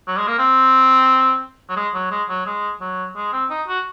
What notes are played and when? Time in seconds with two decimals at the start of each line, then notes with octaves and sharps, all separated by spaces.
0.08 F#3
0.18 G#3
0.28 A#3
0.39 C4
1.69 F#3
1.77 G#3
1.94 F#3
2.11 G#3
2.29 F#3
2.46 G#3
2.81 F#3
3.16 G#3
3.33 C4
3.50 D#4
3.68 F#4